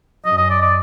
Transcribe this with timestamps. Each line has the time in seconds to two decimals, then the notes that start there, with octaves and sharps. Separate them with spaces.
0.24 F#2 D#5
0.38 D#5
0.50 D5
0.62 D5